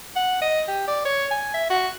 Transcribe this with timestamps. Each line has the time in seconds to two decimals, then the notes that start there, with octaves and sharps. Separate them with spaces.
0.16 F#5
0.41 D#5
0.68 G4
0.87 D5
1.05 C#5
1.31 G#5
1.54 E5
1.70 F#4